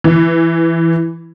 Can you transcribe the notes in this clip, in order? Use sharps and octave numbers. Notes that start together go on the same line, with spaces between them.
E3